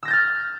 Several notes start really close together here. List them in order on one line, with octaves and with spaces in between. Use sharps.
E6 A#6 G6 A6 F6